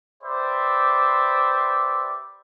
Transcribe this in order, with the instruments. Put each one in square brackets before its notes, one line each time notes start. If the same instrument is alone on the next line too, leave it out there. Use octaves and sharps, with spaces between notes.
[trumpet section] G4 B4 C5 D5 E5